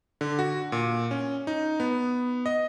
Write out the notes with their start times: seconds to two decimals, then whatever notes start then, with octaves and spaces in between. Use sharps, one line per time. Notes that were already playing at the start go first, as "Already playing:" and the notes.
0.21 D3
0.39 F#4
0.72 A#2
1.11 C#4
1.47 D#4
1.80 B3
2.46 D#5